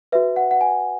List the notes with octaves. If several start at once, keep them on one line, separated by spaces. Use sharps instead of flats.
F#4 B4 E5
F#5
F#5
G#5